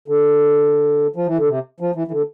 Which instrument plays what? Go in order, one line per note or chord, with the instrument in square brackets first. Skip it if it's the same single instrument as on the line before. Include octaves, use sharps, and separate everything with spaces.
[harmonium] D3
F3
E3
D3
C3
F3
E3
E3
D3